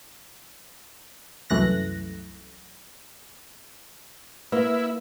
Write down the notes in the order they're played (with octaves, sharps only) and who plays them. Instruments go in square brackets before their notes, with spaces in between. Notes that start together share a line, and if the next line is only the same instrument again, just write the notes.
[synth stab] C2 F#2 E3 A3 F#6 A#6
[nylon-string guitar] A#3 [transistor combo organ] E4 [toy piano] B4